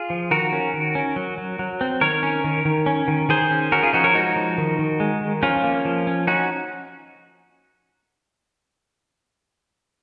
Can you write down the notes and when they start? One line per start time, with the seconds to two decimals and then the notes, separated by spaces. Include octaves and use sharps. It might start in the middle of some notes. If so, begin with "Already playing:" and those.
Already playing: F4 G#4
0.10 F3
0.31 D#3 F#4 A#4
0.53 C#4
0.74 D#3
0.95 C#4
1.16 F#3
1.38 F#3
1.59 F#3
1.81 C4
2.01 D#3 A#4 C#5
2.23 C#4
2.44 D#3
2.65 D#3
2.86 C#4
3.08 D#3
3.29 D#3 G#4 C5
3.51 C#4
3.72 C#4 F#4 A#4
3.83 F4 G#4
3.93 F3 D#4 F#4
4.04 A#4 C#5
4.15 G#3 D#4 F#4
4.36 F3
4.58 D#3
4.79 D#3
5.00 G#3
5.21 D#3
5.43 F3 C#4 F4
5.64 A#3
5.85 F3
6.07 C#4
6.27 C#4 D#4 F#4